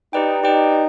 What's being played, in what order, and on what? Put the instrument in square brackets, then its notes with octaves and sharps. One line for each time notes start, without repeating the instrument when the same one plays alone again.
[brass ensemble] D#4 [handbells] G4 B4 D5 G5
[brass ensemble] D#4 [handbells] G4 B4 D5 G5